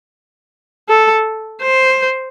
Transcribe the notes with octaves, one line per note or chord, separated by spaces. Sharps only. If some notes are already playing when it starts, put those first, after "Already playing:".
A4
C5